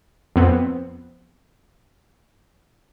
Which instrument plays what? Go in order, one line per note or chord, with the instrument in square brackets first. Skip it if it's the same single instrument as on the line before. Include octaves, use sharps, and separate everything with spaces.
[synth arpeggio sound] F2 B3 C4